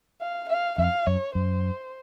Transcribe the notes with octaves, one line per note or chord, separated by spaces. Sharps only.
F5
F5
F2 F5
F#2 C#5
F#2 C5